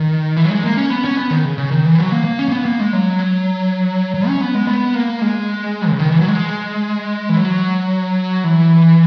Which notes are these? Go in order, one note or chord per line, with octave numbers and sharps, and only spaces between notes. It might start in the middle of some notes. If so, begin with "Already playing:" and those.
Already playing: D#3
E3
F#3
G#3
A#3
C#4
B3
C#4
B3
D#3
C#3
C#3
D#3
E3
F#3
A#3
A#3
C#4
A#3
B3
A#3
G#3
F#3
F#3
C#4
B3
G#3
B3
A#3
G#3
C#3
D#3
E3
F#3
G#3
E3
F#3
E3